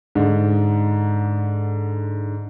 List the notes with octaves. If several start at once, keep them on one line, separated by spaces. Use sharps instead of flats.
G#2 D3